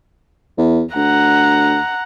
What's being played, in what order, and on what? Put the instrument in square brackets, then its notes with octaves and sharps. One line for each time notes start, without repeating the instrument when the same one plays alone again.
[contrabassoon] E2
[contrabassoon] D2 [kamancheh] F#5 A#5